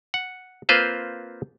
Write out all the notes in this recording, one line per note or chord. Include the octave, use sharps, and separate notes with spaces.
F#5
A#3 C4 F4 B4 C5 F5